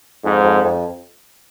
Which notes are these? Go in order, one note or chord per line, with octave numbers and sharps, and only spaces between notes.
F2 G#2
F2
F2